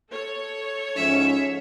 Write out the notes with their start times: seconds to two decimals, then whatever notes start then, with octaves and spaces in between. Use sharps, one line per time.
0.10 A4 C#5
0.96 G#2 F3 C#4 E5